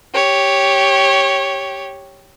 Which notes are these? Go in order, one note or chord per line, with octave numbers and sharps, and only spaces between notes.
G4 C#5